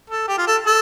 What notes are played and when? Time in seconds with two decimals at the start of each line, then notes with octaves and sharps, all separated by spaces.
0.10 A4
0.28 G4
0.38 F4
0.47 A4
0.66 A4